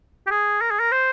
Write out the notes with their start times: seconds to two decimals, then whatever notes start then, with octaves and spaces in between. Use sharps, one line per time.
0.26 G4
0.31 G#4
0.61 A#4
0.71 G#4
0.80 A#4
0.92 C5